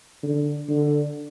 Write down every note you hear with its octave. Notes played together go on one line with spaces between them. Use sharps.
D3
D3